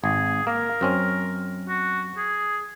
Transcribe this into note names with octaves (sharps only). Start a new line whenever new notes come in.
G#1 G#4
A#3 A#4
F#2 C4 C#4
F#4
G#4